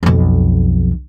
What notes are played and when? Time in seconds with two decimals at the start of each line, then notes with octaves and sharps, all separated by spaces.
0.03 B1 F2